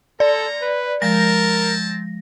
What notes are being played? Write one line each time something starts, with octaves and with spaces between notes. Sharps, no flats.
A#3 A4 D5 A#5
B4
F3 G#3 C4 A#4 C5 A5 A#6